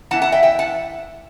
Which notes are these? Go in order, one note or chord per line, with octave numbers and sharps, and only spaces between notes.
E3 B3 E4 F#5 A5
F#5 A5
E5 G5
E5 G5
F#5 A5